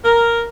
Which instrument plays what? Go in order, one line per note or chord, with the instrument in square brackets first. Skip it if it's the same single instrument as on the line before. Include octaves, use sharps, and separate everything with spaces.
[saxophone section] A#4